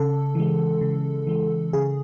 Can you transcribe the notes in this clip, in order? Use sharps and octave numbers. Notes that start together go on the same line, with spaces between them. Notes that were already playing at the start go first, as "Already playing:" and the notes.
Already playing: C#3 A4
E3 G#3
C#3
E3 G#3
C#3 G#4